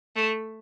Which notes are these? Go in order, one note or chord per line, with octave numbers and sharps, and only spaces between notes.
A3